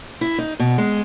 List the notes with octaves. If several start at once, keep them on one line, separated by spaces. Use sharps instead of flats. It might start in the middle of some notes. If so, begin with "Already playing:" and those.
E4
D#4
B2
G#3